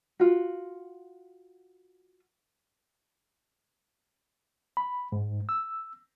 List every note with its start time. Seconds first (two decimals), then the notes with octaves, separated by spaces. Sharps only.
0.20 F4 F#4
4.77 B5
5.12 G#2
5.49 E6